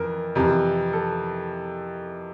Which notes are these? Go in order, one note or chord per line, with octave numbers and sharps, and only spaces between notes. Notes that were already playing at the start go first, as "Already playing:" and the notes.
Already playing: F2 E3 A#4
F2 C3 E3
A4